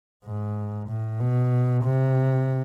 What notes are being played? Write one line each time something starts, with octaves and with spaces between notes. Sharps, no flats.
G#2
A2
B2
C3